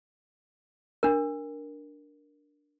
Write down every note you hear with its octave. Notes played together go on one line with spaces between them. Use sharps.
D4 A#4